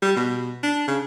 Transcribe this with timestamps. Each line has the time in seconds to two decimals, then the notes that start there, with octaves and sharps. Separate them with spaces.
0.02 G3
0.17 B2
0.63 D4
0.88 C#3